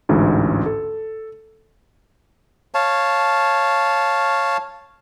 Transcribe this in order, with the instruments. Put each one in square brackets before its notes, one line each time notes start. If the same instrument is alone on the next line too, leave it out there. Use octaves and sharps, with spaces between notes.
[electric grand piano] A1 D2 G#2
A4
[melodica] C#5 F5 A5